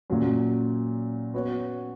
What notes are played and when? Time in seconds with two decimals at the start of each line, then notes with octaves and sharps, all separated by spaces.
0.10 A#2 F#3 C#4
1.34 B3 F#4 C#5